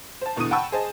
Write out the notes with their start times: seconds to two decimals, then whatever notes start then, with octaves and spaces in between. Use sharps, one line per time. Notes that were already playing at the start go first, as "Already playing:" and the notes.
0.21 C5 A5
0.36 E2 B2 D3 E3 D#6 D#7
0.51 F#5 G5 A5 B5 C#6 E6
0.72 G#4 C5 D#5 A5